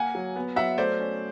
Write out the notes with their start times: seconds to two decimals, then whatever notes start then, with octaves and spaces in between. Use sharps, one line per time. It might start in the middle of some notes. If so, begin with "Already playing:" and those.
Already playing: A#3 F#5 G#5
0.15 F#3
0.36 B3
0.56 F#3 E5 F#5
0.78 A3 C5 D5
1.00 C#4